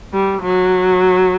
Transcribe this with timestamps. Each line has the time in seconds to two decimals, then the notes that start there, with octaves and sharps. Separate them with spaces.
0.13 G3
0.42 F#3